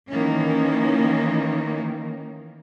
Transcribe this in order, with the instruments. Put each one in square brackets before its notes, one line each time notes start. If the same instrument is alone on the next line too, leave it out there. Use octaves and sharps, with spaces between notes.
[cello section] D#3 E3 A#3 C#4